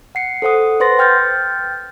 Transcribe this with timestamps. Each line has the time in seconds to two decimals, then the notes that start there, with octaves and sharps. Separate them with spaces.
0.15 F#5 C7 C#7
0.42 A4 C5 F#5 D#6
0.80 B4 C5 F#5 C6 A6 A#6
0.99 G5 F6 G6 A6